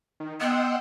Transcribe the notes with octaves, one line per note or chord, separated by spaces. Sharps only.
D#3
B3 D#5 F#5 G5 C6 E6